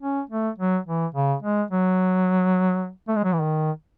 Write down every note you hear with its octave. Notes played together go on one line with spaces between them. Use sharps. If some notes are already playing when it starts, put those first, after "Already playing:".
C#4
A3
F#3
E3
C#3
G#3
F#3
A3
G#3
F#3
E3
D#3